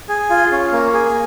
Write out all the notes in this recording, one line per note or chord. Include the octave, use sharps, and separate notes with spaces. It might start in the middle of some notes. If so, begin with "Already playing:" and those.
G#4
F4
C#4
A#3
G#4